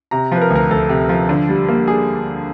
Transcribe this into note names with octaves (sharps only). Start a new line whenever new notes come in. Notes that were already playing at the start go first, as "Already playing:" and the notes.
C3 A#5
F3 B4
A#4
D2
A#4
D2 A4
C3
F3
D3
G3
A#3
G#4